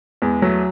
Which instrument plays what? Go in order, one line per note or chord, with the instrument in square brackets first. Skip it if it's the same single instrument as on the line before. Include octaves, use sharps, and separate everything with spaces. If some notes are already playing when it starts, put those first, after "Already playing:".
[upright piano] E2 [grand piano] G#3
[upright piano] F#3 [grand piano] A3